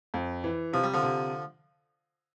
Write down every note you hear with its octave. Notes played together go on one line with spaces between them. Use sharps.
F2
E3
C3 F3
G3
D3 F3
C3